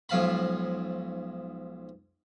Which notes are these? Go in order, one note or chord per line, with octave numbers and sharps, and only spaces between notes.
B1 G#2 F3 F5 A5 B5